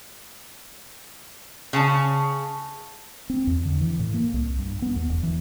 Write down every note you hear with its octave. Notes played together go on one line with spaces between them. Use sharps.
C#3 G#5 A5
C4
E2
D3
E3
A2
A#3
C2
G2
B3
D#2
E1
E3